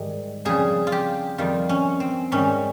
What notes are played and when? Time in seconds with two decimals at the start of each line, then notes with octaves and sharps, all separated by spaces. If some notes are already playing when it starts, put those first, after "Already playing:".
Already playing: G#2 D#3 G3
0.45 F2 C#3 G3 G#4
0.87 F4
0.92 G4
1.38 F2 D#3 G3 F4
1.69 C#4
2.00 C4
2.32 G#2 D#3 G3 C#4